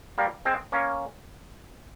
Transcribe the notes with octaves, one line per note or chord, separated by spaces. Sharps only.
G3 A#3
G#3 C4
A#3 C#4